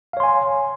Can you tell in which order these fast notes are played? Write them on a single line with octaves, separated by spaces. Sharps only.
F5 C#5 C6 G#5